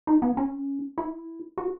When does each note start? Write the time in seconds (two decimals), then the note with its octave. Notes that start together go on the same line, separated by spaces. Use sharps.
0.07 D#4
0.22 B3
0.37 C#4
0.98 E4
1.58 F#4